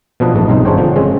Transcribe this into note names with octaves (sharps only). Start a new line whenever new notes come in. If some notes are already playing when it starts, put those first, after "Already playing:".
B2 F3 D4 B4 D#5
A#1 G#2 A3 D#5
B1 G2 C#3 C4 D#4
G1 G#3 D4 C5 C#5 G5
D3 F3
C#3 G#3 C4 C#4